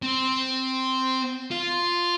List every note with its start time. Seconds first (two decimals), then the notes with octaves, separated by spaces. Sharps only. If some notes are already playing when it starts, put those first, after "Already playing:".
0.03 C4
1.51 F4